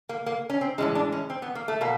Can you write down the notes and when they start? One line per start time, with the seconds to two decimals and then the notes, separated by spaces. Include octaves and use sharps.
0.09 A#3
0.26 A#3
0.50 C#4
0.61 C4
0.78 A2 E3 G#3 C#4
0.95 D4
1.12 C#4
1.30 C4
1.42 B3
1.55 A#3
1.68 A3
1.81 B2 A#3